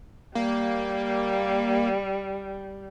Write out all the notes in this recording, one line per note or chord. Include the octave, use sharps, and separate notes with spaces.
G3 A#3